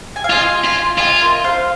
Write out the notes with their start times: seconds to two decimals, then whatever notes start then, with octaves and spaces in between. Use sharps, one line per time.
0.16 G#5
0.24 F5
0.30 F4 D#5 G#5
0.65 F4
0.98 F4 D#5 G#5
1.21 A#4 D#5
1.44 C5 F5